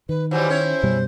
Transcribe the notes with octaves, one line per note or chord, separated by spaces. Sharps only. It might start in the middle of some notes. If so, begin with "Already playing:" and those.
D#3 B4
E3 F#3 G3 C5
C#4 E4 C#5
F#2 B2 G3